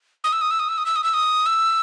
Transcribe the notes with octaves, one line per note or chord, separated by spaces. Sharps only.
D#6
E6
D#6
E6
D#6
E6
D#6
E6
D#6
E6
D#6
E6